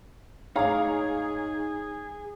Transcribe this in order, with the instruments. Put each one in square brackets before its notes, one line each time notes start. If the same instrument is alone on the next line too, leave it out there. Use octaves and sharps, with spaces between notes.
[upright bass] G#2 A3 [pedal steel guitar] D#4 D6 [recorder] G#4 [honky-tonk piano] C#5 F5 A#5